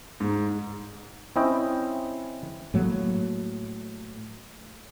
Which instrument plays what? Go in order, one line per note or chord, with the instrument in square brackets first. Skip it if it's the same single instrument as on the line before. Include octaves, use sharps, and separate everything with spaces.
[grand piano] G#2
[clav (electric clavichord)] C4 C#4 E4 D#5 G5
[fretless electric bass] A2 F#3 A#3